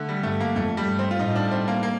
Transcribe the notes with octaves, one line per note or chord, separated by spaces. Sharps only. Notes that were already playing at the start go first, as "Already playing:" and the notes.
Already playing: D3 A3
G3
G2 A3
A#3
F2 A3
G3
G2
C4
F4
A2 D#4
D4
C4
A#3
A#3